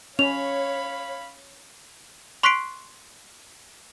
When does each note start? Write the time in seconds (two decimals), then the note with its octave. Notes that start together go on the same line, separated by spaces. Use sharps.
0.19 C#4 C#5 F5 B5 F7
2.43 C6 C#6 F#6 B6 C7 D7